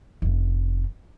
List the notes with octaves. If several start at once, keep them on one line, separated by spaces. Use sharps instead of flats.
F1 C#3